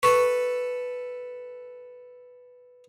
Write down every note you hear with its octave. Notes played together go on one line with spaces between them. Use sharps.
A4 B4 C#6